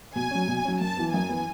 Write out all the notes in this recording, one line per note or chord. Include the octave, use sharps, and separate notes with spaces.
B2 G#5
F#3 C#4
B2
F#3 C#4
F#2 A5
E3 B3
F#2 G#5
E3 B3